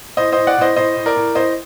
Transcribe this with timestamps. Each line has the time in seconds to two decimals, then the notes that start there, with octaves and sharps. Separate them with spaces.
0.17 A2 C5 D#5
0.32 A2 C5 D#5
0.47 D5 F#5
0.57 A2 C5 D#5
0.76 A2 C5 D#5
0.96 A2
1.06 A#4 D5
1.16 A2
1.35 A2 C5 D#5